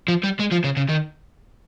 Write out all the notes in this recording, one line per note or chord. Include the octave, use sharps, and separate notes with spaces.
F3
G3
G#3
F3
C#3
C#3
D#3